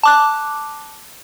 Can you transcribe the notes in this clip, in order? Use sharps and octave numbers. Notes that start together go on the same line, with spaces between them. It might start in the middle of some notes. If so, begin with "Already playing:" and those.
A5 D6 F#6